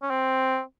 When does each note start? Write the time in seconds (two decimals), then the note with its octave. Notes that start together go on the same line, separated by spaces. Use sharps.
0.03 C#4
0.10 C4